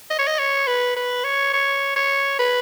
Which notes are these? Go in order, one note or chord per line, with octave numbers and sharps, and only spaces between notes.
D#5
C#5
D#5
C#5
B4
B4
C#5
C#5
C#5
B4